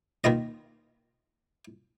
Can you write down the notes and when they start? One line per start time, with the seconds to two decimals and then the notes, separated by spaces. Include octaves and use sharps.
0.24 D#3 A#3 F4 D#5